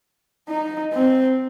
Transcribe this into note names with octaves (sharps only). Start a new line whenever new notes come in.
D#4
C4